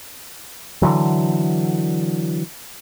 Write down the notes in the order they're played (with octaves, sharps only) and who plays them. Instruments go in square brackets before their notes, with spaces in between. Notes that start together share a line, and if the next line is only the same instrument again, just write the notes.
[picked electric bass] D3 E3 F#3